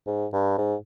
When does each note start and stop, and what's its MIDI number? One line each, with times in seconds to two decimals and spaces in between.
0.07 0.26 44
0.33 0.56 43
0.58 0.75 44